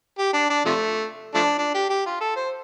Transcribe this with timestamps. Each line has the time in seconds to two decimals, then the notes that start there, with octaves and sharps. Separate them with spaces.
0.18 G4
0.33 D4
0.50 D4
0.65 C3 F3 A3
1.34 F3 A3 D4
1.58 D4
1.74 G4
1.90 G4
2.06 F4
2.20 A4
2.36 C5